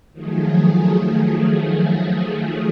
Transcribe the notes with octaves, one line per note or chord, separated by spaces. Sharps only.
D#3 F3 F#3 A3 G#4